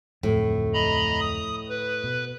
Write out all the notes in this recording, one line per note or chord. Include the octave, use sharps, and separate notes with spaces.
D1 F2 A2
D#5 A#5 B5
D#6
B4
B2